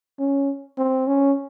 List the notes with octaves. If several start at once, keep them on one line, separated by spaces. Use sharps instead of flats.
C#4
C4
C#4